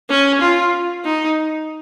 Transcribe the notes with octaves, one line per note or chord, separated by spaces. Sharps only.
C#4
F4
D#4